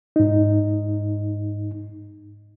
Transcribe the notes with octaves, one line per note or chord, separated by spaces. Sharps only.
G#2 D#4